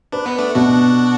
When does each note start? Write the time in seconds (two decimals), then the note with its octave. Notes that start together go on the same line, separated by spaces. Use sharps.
0.12 D4 B4
0.26 B3
0.38 A3 D4
0.55 B2 D4 F#4